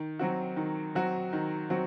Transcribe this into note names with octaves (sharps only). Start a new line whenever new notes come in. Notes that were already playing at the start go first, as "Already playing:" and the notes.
Already playing: D#3
F#3 C4 F#4
D#3
F#3 C4 F#4
D#3
F#3 C4 F#4